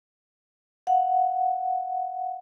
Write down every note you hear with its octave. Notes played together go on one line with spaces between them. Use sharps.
F5 F#5